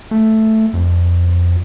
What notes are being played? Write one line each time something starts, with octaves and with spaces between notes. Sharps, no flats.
A3
F2